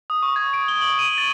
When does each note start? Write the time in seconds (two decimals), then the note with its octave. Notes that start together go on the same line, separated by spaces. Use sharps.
0.10 D#6
0.23 C#6
0.36 G#6
0.53 D7
0.68 G7
0.82 F#7
0.99 D#7
1.18 A6